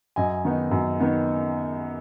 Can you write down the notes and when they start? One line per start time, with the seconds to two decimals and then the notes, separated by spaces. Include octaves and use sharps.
0.16 F#2 D#5 G#5
0.45 D#3 B3 D#4
0.71 F#2
1.00 D#3 B3 D#4